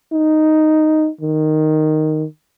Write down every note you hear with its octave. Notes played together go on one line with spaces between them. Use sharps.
D#4
D#3